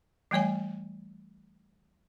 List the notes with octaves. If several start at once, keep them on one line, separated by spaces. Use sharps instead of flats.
E3 G3 A3 C#5 G#5